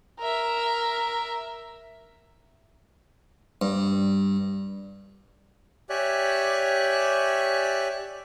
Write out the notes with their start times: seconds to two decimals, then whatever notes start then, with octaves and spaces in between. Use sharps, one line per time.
0.19 A#4 E5
3.62 G2
5.90 G4 C#5 D5 E5 G#5 F#6